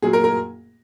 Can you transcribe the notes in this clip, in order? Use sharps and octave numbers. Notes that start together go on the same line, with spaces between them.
A#2 F#3 A#3 G#4
A#4
A#4